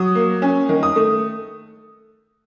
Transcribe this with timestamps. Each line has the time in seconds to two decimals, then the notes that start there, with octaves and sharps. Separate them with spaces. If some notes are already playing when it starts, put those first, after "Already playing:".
Already playing: F#3 D#6
0.15 A#3
0.42 C#4
0.69 D#3
0.83 D#6
0.96 A3